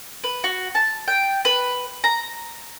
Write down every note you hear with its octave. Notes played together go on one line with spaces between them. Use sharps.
B4
F#4
A5
G5
B4
A#5